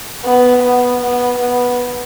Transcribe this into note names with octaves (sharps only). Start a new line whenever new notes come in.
B3
B3
B3
B3